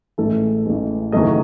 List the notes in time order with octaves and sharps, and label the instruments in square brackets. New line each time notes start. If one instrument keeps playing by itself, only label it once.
[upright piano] A1 A2 E3 G#3 A4
A1 A2 E3 G#3
F#1 E2 D#3 F#3 A3 D#5